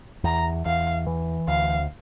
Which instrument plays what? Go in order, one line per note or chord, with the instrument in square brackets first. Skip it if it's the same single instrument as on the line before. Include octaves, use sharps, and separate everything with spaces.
[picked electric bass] E2 [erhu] A#5
[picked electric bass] E2 [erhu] F5
[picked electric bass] E3
[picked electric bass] D2 [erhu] F5